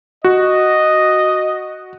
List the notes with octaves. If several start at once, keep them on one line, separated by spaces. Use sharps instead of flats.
F#4 D#5